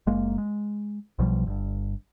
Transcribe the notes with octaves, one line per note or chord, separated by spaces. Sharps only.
F#1 G#3 A#3
G#3
B1 B2 F3 G3
G1 G2